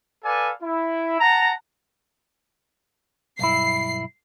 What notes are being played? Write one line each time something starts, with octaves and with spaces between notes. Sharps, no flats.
A4 B4 D5 F5 G#5
E4
F#5 A5 A#5
B1 G2 E4 C7